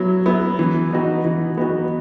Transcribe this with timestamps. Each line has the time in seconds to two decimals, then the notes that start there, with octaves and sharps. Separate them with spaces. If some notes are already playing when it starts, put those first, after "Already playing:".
Already playing: F#3 B3 E4
0.26 B3 E4
0.59 E3
0.91 B3 D#4 F#4
1.24 E3
1.57 B3 D#4 F#4